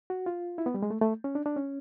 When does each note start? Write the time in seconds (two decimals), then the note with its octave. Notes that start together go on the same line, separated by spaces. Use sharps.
0.10 F#4
0.26 F4
0.58 E4
0.66 B3
0.74 G3
0.83 G#3
0.91 A3
1.01 A3
1.24 C#4
1.35 D4
1.46 D4
1.56 C#4